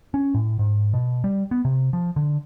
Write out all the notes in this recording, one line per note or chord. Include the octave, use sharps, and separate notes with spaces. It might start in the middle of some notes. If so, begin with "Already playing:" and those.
C#4
A2
G#2
B2
G3
B3
C3
F3
D3